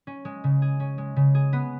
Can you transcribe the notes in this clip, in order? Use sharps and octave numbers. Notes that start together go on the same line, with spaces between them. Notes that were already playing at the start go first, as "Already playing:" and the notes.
C#4
G#3
C#3
G#4
C#4
G#3
C#3
G#4
B3